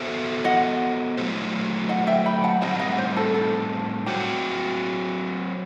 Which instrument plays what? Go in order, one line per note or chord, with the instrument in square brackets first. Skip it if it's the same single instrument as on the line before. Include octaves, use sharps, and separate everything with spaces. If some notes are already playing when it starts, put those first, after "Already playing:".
Already playing: [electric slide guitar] B3 F#4 A4 C5 E5
[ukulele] D#5 F#5
[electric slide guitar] F#3 A3 E4 G4 C5
[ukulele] D#5 F#5
E5 G5
G5 B5
F#5 A5
[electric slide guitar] A2 G3 C4 D#4 [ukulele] D#5 F#5
[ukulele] D#5 F#5
C5
A4
A4
[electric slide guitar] F#3 C4 F#4 [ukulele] G4